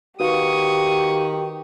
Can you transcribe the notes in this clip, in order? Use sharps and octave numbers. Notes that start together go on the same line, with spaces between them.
D#3 F#4 G4 B4 F5 C#6 D#6